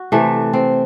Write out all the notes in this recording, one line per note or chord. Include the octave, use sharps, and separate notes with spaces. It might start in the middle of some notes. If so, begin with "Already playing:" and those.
Already playing: F#4
C3 E3 A3
C4